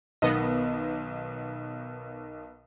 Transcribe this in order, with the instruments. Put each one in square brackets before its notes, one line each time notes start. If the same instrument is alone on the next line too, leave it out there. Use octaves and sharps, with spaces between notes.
[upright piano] B1 D#3 [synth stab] B3 B4 D#5